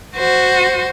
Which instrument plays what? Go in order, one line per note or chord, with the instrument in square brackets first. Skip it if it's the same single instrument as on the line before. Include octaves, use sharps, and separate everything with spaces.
[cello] F#4 C5